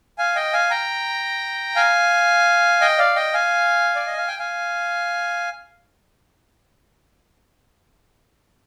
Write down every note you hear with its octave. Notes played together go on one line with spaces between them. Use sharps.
F5 G#5
D#5 G5
F5 G#5
G5 A#5
F5 G#5
D#5 G5
D5 F5
D#5 G5
F5 G#5
D5
D#5
F5
G5
F5 G#5